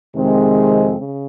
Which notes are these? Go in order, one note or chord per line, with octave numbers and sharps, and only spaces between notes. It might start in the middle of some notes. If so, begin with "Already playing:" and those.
F2 C3 D#3 G#3 C4
C#3